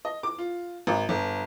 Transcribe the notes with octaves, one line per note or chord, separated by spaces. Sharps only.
D#5
D6
F4
G#1
G1